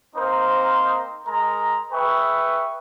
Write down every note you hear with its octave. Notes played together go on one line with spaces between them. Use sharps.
A#3 C4 D#4 A#4 C5
G#3 A#4 A#5
G#4 B4 E5 G5 C#6